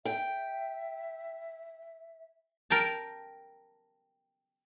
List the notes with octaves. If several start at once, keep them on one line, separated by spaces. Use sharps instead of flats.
E5 G5
A#4 G5 A5